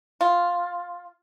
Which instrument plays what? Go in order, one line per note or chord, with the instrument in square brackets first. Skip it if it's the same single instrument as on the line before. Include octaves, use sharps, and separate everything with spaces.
[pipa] F4